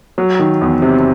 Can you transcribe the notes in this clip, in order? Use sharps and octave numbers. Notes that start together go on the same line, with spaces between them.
F#3
D#3
E2
C3